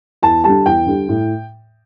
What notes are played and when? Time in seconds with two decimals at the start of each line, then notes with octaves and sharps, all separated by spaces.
0.23 E2 A5
0.44 D3 G3 A5
0.66 E2 G5
0.87 D3 G3
1.09 A2